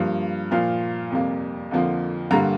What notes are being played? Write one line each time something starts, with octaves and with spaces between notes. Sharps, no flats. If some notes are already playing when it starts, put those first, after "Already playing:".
Already playing: G2 F3 A#3
A#2 F3 A#3 F5
F2 C3 G3 A#3
F2 D3 F3 A#3
G2 D3 G3 A#3 A#5